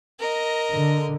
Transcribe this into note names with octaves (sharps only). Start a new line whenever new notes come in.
A#4 D#5
D3